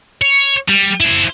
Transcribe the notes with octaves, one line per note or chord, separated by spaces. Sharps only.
C#5
G3
E4 C5